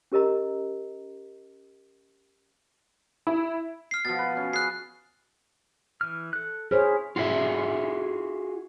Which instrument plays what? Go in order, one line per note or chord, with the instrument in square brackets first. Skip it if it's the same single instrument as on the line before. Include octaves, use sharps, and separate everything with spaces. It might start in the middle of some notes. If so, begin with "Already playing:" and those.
[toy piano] C#4 G4 A#4 D#5 A#5
[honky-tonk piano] E4
[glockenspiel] F6 C7
[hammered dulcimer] B2 F3 [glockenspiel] A6
[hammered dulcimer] B4
C#4
[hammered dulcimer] G#4 [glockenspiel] F#6 C7
[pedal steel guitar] E3 F6
A4 F#6
[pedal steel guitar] E4 F6 [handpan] G#4 C5 C#5
[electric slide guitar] F4 F#4 G#4 E5